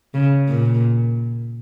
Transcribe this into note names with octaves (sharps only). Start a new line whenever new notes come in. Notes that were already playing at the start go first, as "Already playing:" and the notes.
C#3
A#2